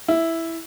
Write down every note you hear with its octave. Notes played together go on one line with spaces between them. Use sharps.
E4